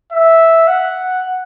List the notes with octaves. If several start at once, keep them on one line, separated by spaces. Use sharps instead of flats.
E5
F#5